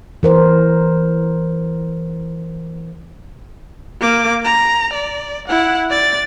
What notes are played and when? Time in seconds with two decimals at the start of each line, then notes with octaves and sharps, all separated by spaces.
0.23 E3 A#4 C5
4.01 A#3 D6
4.44 A#5
4.93 D5
5.48 E4 F#5
5.90 D5 A6